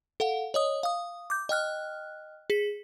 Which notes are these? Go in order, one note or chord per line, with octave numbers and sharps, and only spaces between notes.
A4 F5 F#5
C#5 D#5 D#6
F5 D#6
D6 G6
D#5 G5 F6 F#6
G#4 B6